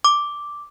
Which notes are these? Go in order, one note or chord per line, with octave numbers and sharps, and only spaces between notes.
D6